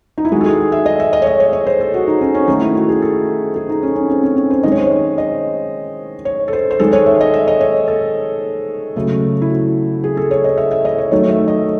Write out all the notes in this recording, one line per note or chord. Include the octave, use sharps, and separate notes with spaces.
D#4
E4
D#3 G#3 F#4
A4
G#4
E5
D#5
E5
D#5
C#5
D#5
C#5
C#5
C5
A4
F#4
D#4
C#4
C#4
D#3 A3 D#4
E4
F#4
G#4
A4
G#4
D#4
C#4
C#4
C4
C#4
C#4
C5
D#3 G#3 D#5
C#5
C5
C#5
D#5
C#5
A4
C5
C5
D#3 G#3 A4
C#5
E5
D#5
E5
D#5
C#5
A4
C#3 F#3 A3
E4
F#4
G#4
A4
C#5
D#5
E5
E5
D#5
C#5
D#3 F#3 A3 C#5
E5
D#5